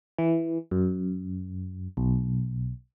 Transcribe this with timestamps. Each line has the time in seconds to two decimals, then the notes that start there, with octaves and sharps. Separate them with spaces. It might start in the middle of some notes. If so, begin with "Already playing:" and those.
0.18 E3
0.71 F#2
1.97 B1